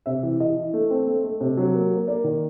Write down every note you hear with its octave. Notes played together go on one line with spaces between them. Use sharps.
C3 E5
E3
E3 D#5
E3
A3
C4
A3
A3
C3
F#3
A#3
A#3
A#3 D5
D#3